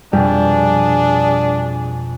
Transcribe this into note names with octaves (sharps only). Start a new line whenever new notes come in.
F2 B2 G3 D4 G#4